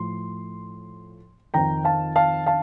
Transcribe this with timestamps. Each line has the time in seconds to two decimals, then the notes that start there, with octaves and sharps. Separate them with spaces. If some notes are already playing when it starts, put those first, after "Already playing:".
Already playing: A2 F3 C6
1.54 F2 D#3 G5 A#5
1.84 F5 A5
2.16 F5 A5
2.46 F5 A5